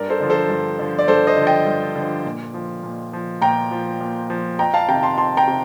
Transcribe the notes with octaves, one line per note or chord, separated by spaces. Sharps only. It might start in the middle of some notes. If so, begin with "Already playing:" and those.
Already playing: G2 A#4 D5
A4 C5
D3 F3
A4 C5
G2
D3 F3
D5
G2 A4 C5
C5 D#5
D3 F3
D#5 G5
G2
D3 F3
A#2
F3
A#2
F3
A#2 G5 A#5
F3
A#2
F3
F2 G5 A#5
F5 A5
C3 D#3 G5 A#5
A5 C6
F2 A5 C6
G5 A#5
C3